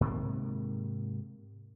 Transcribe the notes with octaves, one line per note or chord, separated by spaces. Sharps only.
G#2 C3 D#3 A#3